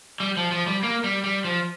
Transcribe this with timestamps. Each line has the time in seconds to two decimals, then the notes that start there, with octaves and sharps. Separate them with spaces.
0.20 G3
0.37 F3
0.51 F3
0.67 G3
0.83 A#3
1.04 G3
1.24 G3
1.45 F3